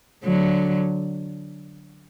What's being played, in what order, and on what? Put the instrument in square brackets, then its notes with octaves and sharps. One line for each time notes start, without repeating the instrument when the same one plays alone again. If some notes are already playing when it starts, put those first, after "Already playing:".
[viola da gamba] D3 F#3